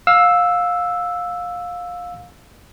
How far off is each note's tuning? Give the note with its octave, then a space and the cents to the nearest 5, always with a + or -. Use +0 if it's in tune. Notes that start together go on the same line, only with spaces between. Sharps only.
F5 +20 E6 +0